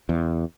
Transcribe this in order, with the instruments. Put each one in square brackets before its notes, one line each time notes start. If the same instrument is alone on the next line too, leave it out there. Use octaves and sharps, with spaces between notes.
[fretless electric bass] E2